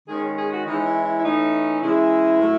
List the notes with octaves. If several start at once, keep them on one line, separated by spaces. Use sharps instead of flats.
D#3 G#3 C#4 G#4
G#4
F#4
E3 G#3 C#4 D#4
E4
E4
E4
E3 A3 C#4 D#4
C#3 E3 G#3 E4
A2 F#3 A3